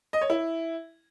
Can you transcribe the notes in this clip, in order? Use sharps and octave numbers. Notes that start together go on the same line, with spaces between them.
D#5
C#5
E4